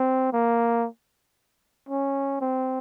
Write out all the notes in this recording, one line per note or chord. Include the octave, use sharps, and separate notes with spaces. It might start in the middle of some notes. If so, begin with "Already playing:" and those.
Already playing: C4
A#3
C#4
C4